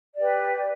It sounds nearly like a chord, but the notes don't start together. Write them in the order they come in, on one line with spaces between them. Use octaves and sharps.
D5 G4 B4